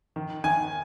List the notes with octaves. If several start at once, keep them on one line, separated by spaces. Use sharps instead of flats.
D#3
D#3 G#5